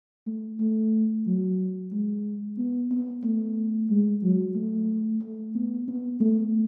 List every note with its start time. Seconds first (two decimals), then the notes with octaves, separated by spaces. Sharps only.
0.27 A3
0.60 A3
1.27 F#3
1.91 G#3
2.58 B3
2.91 B3
3.24 A3
3.90 G#3
4.23 F#3
4.55 A3
5.21 A3
5.55 B3
5.88 B3
6.20 A3